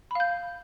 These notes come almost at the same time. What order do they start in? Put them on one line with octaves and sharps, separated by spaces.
B5 F5 G6